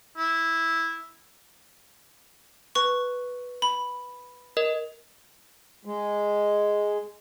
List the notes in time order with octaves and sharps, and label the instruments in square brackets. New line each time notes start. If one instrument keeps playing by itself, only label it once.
[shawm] E4
[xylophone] B4 C#6
B5
[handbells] A#4 D#5
[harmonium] G#3